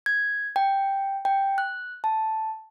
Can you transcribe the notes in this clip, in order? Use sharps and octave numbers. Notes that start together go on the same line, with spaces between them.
G#6
G5
G5
F#6
A5